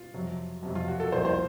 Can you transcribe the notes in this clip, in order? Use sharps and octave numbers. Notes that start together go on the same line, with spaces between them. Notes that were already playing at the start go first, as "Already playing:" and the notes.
Already playing: F4
F2 C3 F#3
F2 C3 F#3
F4
F#4
A4
C2 A#2 F3 C5
C5